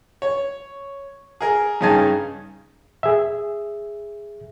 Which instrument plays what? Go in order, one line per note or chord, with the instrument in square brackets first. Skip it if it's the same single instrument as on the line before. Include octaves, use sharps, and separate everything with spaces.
[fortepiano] C#5
G#4 A#4
G2 C#3 D#4 G#4 G#5 A5
[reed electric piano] G#4 E5